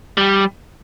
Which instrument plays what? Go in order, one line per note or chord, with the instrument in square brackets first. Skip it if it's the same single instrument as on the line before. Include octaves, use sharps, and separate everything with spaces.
[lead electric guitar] G3